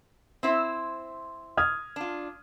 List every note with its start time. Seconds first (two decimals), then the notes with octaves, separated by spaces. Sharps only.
0.43 C4 E4 C5
1.57 D#6 F6 G#6
1.96 D4 F4